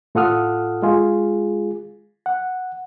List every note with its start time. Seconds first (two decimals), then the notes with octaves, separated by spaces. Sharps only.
0.15 A2 F4 A4 F#5 D#6 F6
0.82 G#3 F4 G#4
2.26 F#5